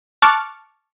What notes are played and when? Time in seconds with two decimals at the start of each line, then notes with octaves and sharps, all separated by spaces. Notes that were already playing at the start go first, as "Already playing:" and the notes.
0.22 A5 C#6 D6 F6 F#6 A6